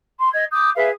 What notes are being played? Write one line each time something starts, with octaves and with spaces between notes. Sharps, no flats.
C6
D#5 G#6
D6 D#6 G6
G#4 B4 E5 F5